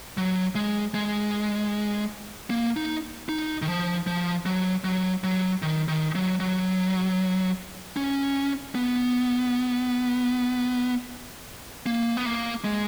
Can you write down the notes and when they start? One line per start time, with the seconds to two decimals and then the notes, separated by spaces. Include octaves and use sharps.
0.17 F#3
0.55 G#3
0.94 G#3
2.50 A#3
2.77 D#4
3.29 D#4
3.62 D#3
3.68 F3
4.07 F3
4.46 F#3
4.84 F#3
5.24 F#3
5.62 D#3
5.88 D#3
6.15 F#3
6.40 F#3
7.97 C#4
8.75 B3
11.86 A#3
12.17 B3
12.26 A#3
12.64 G#3